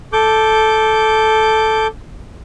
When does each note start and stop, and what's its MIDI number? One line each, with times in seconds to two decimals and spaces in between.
0.13 1.87 69
0.13 1.87 86
0.13 1.87 91